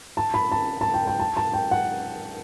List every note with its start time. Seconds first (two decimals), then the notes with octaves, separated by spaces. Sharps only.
0.17 A5
0.34 B5
0.52 A5
0.81 A5
0.94 G5
1.07 G5
1.19 A5
1.37 A5
1.54 G5
1.71 F#5